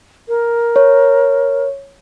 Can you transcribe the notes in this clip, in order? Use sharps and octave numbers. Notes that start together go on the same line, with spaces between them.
A#4
C#5